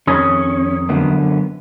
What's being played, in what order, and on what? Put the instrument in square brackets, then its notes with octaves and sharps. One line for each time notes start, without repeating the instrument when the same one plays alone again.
[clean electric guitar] F2 D#3 G#4 [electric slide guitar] C#4
[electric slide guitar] F#2 D3 B3